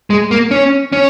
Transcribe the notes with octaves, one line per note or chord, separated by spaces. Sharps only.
G#3
A#3
C#4
C#4